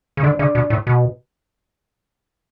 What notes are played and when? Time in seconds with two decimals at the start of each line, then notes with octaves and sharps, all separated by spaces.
0.17 C#3
0.23 D3 D4
0.39 C#3 D4
0.55 B2
0.70 A2
0.87 B2